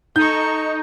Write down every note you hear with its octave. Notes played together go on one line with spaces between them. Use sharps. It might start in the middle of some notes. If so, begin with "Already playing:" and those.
D#4 A4 C#6 G6